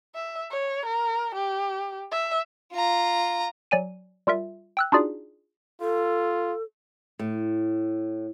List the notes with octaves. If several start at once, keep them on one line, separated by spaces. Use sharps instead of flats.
E5
C#5
A#4
G4
E5
F4 A#5
F#3 D5 G#5 D#7
G3 F4 A#4 E5
G5 E6 F#6
D4 D#4 F4 F#4 G#4 D5
F4 A4
A2